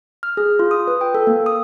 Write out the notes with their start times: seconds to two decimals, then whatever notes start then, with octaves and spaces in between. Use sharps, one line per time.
0.23 F6
0.37 G#4
0.59 F4
0.71 D#6
0.87 B4
1.01 G5
1.15 A4
1.27 A#3
1.46 D#6